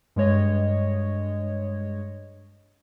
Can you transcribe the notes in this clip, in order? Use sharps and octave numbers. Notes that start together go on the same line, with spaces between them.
G2 G#3 C#5 D#5